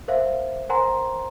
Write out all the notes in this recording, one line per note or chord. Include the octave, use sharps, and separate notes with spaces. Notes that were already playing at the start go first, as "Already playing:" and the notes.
A#4 C5 E5 F5
A#4 C5 F#5 G#5 A#5 C6